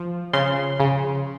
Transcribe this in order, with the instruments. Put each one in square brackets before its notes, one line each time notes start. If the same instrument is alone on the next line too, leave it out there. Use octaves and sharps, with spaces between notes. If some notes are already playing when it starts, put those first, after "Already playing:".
Already playing: [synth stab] F3
C#3 C6
C#3